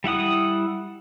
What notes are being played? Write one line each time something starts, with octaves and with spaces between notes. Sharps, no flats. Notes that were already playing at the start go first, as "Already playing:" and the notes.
G3 E4 F#5 D#6